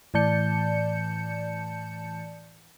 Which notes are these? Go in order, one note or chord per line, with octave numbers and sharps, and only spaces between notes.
A2 E3 D5 A5 G6 C#7